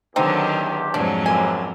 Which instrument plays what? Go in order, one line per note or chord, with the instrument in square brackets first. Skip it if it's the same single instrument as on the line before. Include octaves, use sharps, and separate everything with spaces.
[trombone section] E2 G4 [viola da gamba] D3 D#3 F#3 [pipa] C4 D#4
[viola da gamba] F2 G#2 F#3 [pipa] D4
[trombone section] B1 F#2 D3 [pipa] G#5